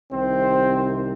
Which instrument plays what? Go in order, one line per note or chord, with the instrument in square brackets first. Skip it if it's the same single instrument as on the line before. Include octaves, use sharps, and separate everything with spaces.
[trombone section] C2 C3 D#3 G3 C4 C5